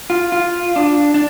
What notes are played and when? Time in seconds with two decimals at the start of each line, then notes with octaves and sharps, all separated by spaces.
0.10 F4
0.32 F4
0.76 D4
1.14 D4